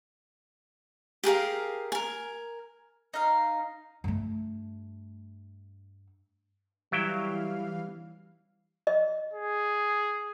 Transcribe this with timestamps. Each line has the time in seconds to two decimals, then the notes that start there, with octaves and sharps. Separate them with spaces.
1.24 G4 G#4 A#4 F5
1.92 A#4 G#5
3.14 D#4 F5
4.04 G2 A3
6.92 E3 F#3 G3 E4 F5 G5
8.87 D#5
9.33 G#4